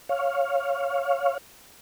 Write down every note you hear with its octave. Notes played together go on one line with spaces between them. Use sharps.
C#5 F5